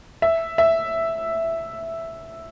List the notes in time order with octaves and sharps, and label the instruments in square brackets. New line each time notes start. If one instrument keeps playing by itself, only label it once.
[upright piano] E5
E5